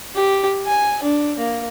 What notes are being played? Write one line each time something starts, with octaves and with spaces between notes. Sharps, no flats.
G4
G#5
D4
A#3